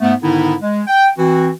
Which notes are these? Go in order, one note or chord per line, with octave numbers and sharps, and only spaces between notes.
G#2 A3 B3
G#2 D3 D#3 B3 D#4 E4
G#3
G5
E3 C4 F#4